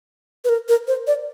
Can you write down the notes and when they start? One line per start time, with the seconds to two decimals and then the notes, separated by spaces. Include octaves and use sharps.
0.45 B4
0.49 A#4
0.69 A#4
0.88 C5
1.07 D5